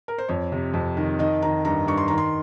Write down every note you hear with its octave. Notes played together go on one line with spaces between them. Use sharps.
A#4
C5
F2 C#5
C3
F2
D#3
D#3 D#5
D#3 A#5
G2 A#5
G2 C#6
C6
D#3 A#5
C6